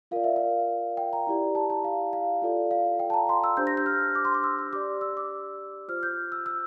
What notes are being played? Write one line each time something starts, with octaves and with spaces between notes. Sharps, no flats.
F4 A#4 D5 F5
E5
F5
G5
A#5
E4 G4 D5
A5
A5
F5
F5
F4 A4 D5
F5
G5
A5
A#5
C6
E6
D4 G4 C5 G6
A#6
G6
F6
D6
C6
D6
E6
C6
G4 D5 D6
E6
D6
F4 C5 F6
G6
E6
E6